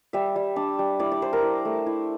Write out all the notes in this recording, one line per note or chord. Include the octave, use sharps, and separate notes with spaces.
G3 E5
G3
D4
G3
E4 D5
D5
E4 C5
A#4
E4
A3
E4